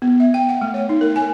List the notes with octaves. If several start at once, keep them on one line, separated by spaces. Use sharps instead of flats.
B3
E5
G5
F#5
A3
C#5
D#4
A#4
G#5